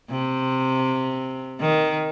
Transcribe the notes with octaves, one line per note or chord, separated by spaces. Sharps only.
C3
D#3